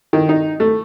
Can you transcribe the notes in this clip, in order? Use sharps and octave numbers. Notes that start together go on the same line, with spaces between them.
D#3
D#4
A3